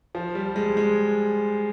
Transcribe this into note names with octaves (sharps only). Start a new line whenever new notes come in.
F3
G3
G#3
G#3